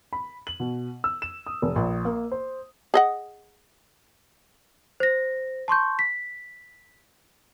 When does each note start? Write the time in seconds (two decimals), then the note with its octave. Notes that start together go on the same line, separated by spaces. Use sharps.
0.13 B5
0.47 F#7
0.60 B2
1.04 E6
1.22 E7
1.46 D#6
1.62 F1
1.76 A#1
2.05 A#3
2.32 C5
2.94 G#4 D#5 F#5
5.00 C5 A#6
5.68 A5 C6 C#6 G6
5.99 B6